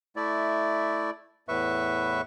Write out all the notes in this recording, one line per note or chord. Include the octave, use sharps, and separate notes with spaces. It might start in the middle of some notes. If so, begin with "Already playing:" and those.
A3 E4 D5
E2 A2 B4 E5 C#6